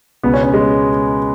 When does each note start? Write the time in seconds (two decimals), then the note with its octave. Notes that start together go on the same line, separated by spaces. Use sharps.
0.23 C#2 B2 B3
0.34 C#4
0.44 C#4
0.54 G#3